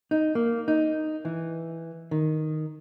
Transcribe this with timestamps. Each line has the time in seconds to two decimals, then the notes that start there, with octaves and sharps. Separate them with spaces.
0.11 D#4
0.35 A#3
0.68 D#4
1.25 E3
2.11 D#3